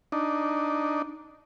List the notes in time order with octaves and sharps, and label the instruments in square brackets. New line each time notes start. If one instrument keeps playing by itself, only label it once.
[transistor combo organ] D4 D#4